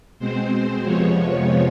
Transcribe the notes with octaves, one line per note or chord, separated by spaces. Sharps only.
B2 G#3 C4 C5
F2 C3 F3 G#3 B3 C#5